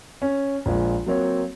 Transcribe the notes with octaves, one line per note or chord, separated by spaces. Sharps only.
C#4
A#1 F3 G#3
F#3 A#3 C4 C#5